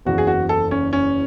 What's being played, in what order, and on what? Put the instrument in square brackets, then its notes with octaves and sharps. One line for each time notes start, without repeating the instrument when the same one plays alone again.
[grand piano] F#1 E2 C#3 F#4
G#4
F#4
A4
C#4
C#4